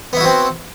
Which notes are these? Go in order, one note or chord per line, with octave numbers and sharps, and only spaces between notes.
B3 C4 E4 F#4